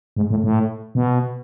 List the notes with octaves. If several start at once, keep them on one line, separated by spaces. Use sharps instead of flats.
G#2
A2
A2
B2